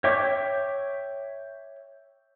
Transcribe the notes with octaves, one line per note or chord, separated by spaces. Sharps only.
C#5 E5 G5 C#6 D6